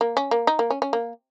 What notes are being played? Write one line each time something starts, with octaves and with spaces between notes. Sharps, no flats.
A#3
C#4
A#3
D#4
A#3
C#4
C#4
A#3